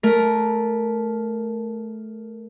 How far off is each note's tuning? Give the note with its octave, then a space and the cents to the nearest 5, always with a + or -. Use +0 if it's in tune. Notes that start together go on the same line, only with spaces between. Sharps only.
A3 -15 A#4 +0